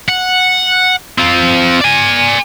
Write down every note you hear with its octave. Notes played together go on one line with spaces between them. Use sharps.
F#5
C4 F4
D5 G#5